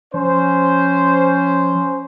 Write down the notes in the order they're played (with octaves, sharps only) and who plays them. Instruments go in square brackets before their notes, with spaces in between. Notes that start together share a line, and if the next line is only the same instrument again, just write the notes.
[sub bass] F3 [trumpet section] C#4 C5